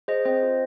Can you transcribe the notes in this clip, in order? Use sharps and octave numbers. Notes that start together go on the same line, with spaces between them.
G#4 C5 D#5
C4 C5 D#5
F4